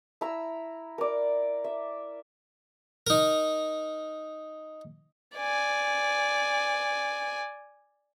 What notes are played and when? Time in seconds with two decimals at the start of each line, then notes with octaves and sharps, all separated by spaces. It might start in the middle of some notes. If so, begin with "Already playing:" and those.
0.21 E4 A#5 E6
0.98 A#4 D5
1.64 E5
3.07 D#4 A#4
5.36 D5 G#5